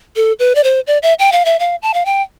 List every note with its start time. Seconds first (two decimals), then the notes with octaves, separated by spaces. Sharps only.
0.16 A4
0.39 B4
0.55 D5
0.64 C5
0.87 D5
1.03 E5
1.19 G5
1.32 F5
1.45 E5
1.59 F5
1.82 A5
1.94 F5
2.05 G5